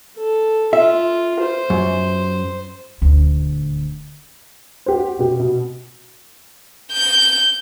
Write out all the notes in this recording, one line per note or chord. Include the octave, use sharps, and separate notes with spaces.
A4
F4 E5
C5
F#2
D#1 D2
F#4 G4 C5
B2 G4
B2
G6